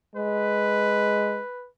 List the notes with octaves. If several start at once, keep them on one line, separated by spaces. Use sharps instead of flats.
G#3 B4